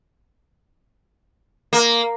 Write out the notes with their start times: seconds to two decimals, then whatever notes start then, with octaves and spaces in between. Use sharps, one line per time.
1.73 A#3